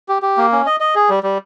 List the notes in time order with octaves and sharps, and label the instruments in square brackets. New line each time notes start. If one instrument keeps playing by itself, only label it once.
[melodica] G4
G4
A#3
C#4
D#5
D#5
G#4
G3
G3